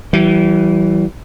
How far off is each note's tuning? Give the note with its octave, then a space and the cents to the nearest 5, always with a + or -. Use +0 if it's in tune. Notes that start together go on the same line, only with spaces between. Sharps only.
E3 +0 G3 -40